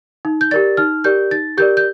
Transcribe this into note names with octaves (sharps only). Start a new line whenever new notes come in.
D#4
G6
G4 A#4 D5 A6
D#4 F6
G4 A#4 D5 G6
D#4 A6
G4 A#4 D5 G6
G6